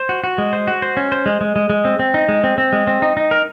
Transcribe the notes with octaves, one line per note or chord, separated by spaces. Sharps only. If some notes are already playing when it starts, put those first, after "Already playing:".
Already playing: C5
F#4
F#4
G#3
C5
F#4
C5
C#4
C5
G#3
G#3
G#3
G#3
C4
C4
D#4
G#3
C4
C4
G#3
C4
D#4
D#4
A#4